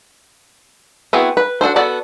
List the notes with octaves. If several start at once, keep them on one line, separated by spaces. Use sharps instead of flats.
B3 C4 E4 F#4 G#4
B4
D4 F#4 A4 C5
B3 F#4 A4 D5 A5